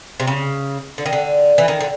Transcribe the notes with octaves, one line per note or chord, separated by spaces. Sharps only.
C3
C#3
D3
D#3
D3
E3
D#3
D3